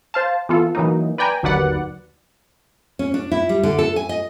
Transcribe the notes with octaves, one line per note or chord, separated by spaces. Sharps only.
C5 F5 A5
E3 B3 F4 A4
E3 F#3 A#3 D#4
B4 D5 G5 G#5 A#5
G1 D#2 F#3 B4 D5 F#5
C#4
D4
E4
G3
D3
A4
G#5
D#5